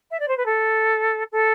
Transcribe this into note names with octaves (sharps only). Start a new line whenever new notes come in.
E5
D5
C5
B4
A4
A4